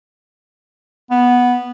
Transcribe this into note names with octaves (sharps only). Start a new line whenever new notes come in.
B3